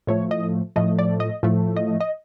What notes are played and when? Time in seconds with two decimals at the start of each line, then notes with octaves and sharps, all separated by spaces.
0.07 A2 F3 A3 C#5
0.31 D#5
0.76 A2 F3 A3 D#5
0.99 D5
1.20 D#5
1.43 A2 F3 A3
1.76 D#5
2.00 D#5